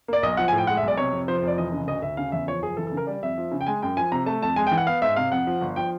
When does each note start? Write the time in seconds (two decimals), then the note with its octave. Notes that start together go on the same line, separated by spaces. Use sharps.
0.08 A#3 D5
0.23 B1 D#5
0.37 F3 F#5
0.48 G#5
0.53 A2
0.58 G5
0.67 G#3 F#5
0.77 E5
0.82 B1
0.88 D5
0.97 C3 C#5
1.12 F2
1.28 F3 C5
1.38 C5
1.43 F1 D5
1.58 E3 D#5
1.72 C#3
1.87 D2 D#5
2.02 D2 E5
2.17 C#3 F5
2.32 E2 E5
2.47 F3 C#5
2.62 F#1 G#4
2.77 E3 A4
2.87 A4
2.92 C#3
2.97 A#4
3.07 G3 D5
3.22 F2 E5
3.38 F3
3.52 C#3
3.61 G5
3.67 G#3 G#5
3.82 F#2 G5
3.97 F3 G#5
4.12 C3 A#5
4.26 A3 A5
4.42 F2 A5
4.56 G#3 G#5
4.67 G5
4.71 E3
4.77 F#5
4.87 B3 F5
5.02 G#2 E5
5.16 C3 F5
5.32 F2 F#5
5.47 F3
5.61 G1
5.76 F3 G5